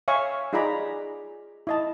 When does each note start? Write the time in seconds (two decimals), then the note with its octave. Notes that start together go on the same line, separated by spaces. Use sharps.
0.08 C#5 E5 F5 G#5 C#6
0.53 D#4 F4 G#4 D5 A#5 B5
1.67 E4 D#5 A5